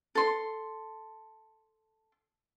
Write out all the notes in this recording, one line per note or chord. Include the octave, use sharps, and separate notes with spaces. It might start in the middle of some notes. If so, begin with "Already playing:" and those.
A4 C6